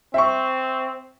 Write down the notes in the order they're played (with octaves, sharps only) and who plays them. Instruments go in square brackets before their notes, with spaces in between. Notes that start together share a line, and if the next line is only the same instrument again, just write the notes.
[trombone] C4 [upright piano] E5 C#6